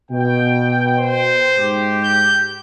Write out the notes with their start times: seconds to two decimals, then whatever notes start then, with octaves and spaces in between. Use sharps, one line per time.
0.11 B2 G5
0.98 C5
1.57 G#2 G4
2.04 G6